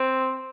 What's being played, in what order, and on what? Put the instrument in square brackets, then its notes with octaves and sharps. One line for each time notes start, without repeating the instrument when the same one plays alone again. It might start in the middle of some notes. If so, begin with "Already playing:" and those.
Already playing: [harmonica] C4